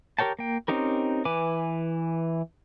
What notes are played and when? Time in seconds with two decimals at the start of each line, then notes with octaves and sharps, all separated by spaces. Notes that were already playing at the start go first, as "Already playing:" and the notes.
0.19 G4 A#4 C#5 G5 A5
0.39 A#3 G5
0.68 C4 C#4 D#4 G4 A#4
1.25 E3 B4 G#5 D6